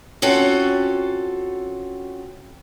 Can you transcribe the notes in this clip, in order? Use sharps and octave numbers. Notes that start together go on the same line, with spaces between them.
C4 C#4 F4 F#4 A4